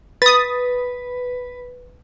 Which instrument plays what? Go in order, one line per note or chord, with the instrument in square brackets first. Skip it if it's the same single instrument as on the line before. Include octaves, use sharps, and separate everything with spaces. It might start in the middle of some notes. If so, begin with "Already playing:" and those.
[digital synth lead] B4 [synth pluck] D#6 A6